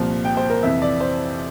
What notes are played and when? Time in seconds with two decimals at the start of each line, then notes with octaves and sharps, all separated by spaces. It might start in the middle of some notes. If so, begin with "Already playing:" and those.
Already playing: C2 A#2 F3
0.25 G5
0.37 C5
0.50 A#4
0.63 F2 C3 E3 E5
0.82 D5
1.01 C5